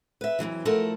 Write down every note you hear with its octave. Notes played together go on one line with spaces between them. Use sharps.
B4 E5
F2 B2 E3 F#3
F3 A3 E4 F#4 A4 A#4